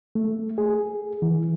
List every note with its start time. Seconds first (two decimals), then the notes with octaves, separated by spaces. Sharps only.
0.15 A3
0.58 G#4
1.22 E3